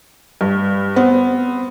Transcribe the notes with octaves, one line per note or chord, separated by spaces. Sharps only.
G2
B3 C4